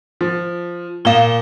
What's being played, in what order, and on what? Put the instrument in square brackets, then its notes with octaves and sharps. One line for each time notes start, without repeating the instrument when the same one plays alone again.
[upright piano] F3
[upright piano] A#2 [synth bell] F5 G7